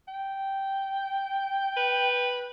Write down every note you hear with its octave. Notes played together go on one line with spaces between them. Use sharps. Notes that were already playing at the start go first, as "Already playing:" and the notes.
G5
B4